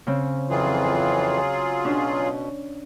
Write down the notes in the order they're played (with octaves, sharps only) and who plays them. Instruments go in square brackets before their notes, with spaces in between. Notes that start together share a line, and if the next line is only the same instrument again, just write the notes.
[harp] C#3 C4
[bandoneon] F2 E3 [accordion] F#3 F4 G#4
[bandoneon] B2 [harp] C#4 D4